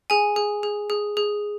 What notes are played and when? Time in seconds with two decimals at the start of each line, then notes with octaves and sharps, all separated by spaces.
0.10 G#4 G#5
0.36 G#4
0.63 G#4
0.90 G#4
1.17 G#4